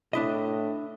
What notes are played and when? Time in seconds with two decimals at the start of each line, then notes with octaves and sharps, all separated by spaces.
0.13 A2 D4 E4 D#5